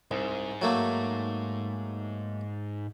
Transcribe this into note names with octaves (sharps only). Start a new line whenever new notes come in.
C2 G#2
F#3 A3 A#3